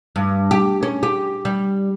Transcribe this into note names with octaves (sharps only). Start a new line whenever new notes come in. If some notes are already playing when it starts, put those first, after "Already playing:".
G2
G4
C#4
G4
G3